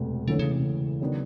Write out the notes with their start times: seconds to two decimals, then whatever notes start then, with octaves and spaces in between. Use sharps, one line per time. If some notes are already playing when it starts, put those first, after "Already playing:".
Already playing: E1 D2 C3
0.27 A2 D3 E3 A3 C#4
0.39 C#3
0.52 C3
0.64 C#3
1.01 D#3 F#3 B3 D4